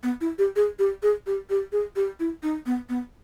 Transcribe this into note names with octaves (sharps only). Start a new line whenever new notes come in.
B3
E4
G4
G#4
G4
G#4
G4
G4
G#4
G4
E4
D#4
B3
B3